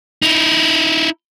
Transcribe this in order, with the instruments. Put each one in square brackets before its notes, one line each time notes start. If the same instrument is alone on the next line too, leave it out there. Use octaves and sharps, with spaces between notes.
[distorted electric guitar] D#4 E4